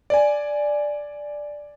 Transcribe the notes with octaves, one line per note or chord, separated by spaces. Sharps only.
D5 G#5